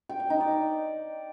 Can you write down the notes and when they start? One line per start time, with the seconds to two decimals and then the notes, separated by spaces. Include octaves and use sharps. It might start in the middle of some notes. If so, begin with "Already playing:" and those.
0.09 G5
0.20 D5
0.30 D#4
0.40 D5